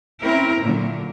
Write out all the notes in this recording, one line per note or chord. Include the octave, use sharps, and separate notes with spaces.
C4 C#4 E4 A#4
A#2 D3 F#3